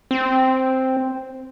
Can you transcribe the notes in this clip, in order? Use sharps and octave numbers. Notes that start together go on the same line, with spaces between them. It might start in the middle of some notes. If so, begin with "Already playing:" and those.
C4